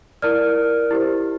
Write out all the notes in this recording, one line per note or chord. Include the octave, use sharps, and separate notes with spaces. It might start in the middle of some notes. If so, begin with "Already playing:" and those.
E4 A#4 D5 F6
E4 G4 C5